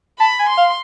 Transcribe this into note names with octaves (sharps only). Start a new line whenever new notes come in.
A5 B5
G#5
C6
F5